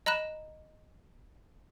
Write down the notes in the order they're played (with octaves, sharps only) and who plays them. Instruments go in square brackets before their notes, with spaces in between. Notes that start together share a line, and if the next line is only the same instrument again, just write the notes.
[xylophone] D#5 A#5 B5 F#6 E7